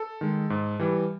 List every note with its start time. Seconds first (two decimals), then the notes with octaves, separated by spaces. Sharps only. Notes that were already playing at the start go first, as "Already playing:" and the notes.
Already playing: A4
0.21 D#3 G#3
0.50 G#2
0.80 E3 G3